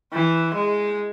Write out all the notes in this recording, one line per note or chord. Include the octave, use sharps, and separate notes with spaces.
E3
G#3